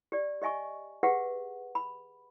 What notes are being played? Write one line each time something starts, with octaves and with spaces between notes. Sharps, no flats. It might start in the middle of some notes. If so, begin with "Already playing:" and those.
G4 D5
G4 D#5 E5 G#5 C#6
G4 G#4 B4 E5 F#5
B5